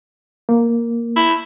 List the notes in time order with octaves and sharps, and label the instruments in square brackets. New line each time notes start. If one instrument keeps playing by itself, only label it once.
[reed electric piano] A#3
[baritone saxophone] E4